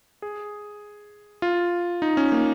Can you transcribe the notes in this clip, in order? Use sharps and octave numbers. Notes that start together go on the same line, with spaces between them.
G#4
F4
D#4
C#4
A#3